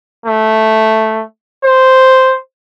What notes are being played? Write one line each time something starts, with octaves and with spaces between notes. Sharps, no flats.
A3
C5